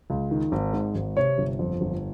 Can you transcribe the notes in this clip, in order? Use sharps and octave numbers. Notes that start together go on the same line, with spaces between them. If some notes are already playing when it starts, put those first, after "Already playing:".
C#2
D#3
G#1
G#2
G#1
C3 C#5
G1
F2
G1